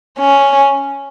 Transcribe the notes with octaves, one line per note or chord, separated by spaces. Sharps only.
C#4